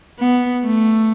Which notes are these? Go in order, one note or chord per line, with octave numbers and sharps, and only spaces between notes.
B3
A3